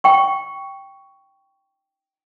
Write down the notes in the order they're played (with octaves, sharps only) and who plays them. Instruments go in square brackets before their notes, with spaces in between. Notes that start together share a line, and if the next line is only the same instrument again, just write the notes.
[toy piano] G5 C#6